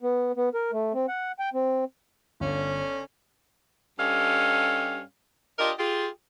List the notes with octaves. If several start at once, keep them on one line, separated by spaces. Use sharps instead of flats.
B3
B3
A#4
A3
C4
F#5
G5
C4
G1 D3 C#4
G2 C#4 G4 A4 D#5 F5
D4 F4 G4 A#4 D#5
F4 G4 G#4